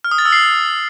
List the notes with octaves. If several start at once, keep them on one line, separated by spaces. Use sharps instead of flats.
F6
D#6
A6
E6
C7